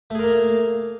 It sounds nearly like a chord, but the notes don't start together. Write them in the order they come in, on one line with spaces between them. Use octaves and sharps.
A3 G#4 A#4 A#3